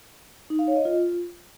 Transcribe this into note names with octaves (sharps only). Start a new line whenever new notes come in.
D#4
F5
C#5
D#5
F4